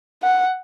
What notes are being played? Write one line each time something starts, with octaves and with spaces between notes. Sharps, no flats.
F#5